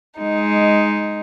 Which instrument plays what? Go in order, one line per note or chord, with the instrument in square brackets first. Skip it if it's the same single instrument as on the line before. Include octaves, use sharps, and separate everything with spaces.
[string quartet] G#3 D#4